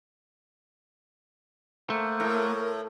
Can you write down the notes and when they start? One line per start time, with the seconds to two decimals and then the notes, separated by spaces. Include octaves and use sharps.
1.90 A3 A#3 C5 F#5
2.20 A2 A#4